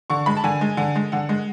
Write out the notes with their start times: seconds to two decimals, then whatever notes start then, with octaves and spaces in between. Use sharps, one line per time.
0.10 D3 C#6
0.26 G#3 B5
0.37 A5
0.44 D3 G#5
0.61 G#3
0.77 D3
0.96 G#3
1.12 D3 F#5
1.29 G#3